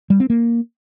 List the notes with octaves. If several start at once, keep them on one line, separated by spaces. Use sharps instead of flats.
G3
C4
A#3